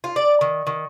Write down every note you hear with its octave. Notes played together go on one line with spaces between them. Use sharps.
F4
D5
D#3
D#3